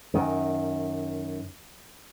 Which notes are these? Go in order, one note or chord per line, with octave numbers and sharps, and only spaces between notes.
F#2 D#3